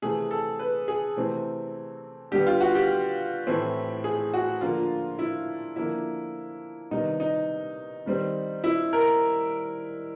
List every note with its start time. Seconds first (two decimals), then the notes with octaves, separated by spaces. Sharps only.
0.02 C3 E3 A3 G#4
0.31 A4
0.59 B4
0.88 G#4
1.17 C3 E3 A3 C4
2.31 D3 G3 B3 G4
2.47 F4
2.61 F#4
2.75 G4
3.47 A2 E3 A3 C4
4.04 G#4
4.34 F#4
4.61 D3 F3 A#3 F4
5.19 E4
5.76 D3 F3 A#3 E4
6.91 C3 D#3 G3 B3 D#4
7.20 D#4
8.06 D#3 G3 C4
8.64 E4
8.93 A#4